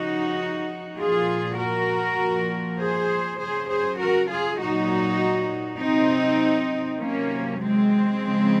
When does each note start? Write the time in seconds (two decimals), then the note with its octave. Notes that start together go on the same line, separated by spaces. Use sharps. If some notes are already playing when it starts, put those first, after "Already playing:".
Already playing: C#3 F3 D#4 F#4
0.98 A#2 F3 F4 G#4
1.58 F#4 A#4
2.18 A#2 F3
2.78 G#4 C5
3.38 C#3 F#3 G#4 C5
3.68 G#4 C5
3.98 F#4 A#4
4.29 F4 G#4
4.58 A#2 F#3 D#4 F#4
5.79 C3 F#3 C4 D#4
7.00 C3 D#3 F#3 A#3 C#4
7.60 G#3 C4
8.20 C#3 F3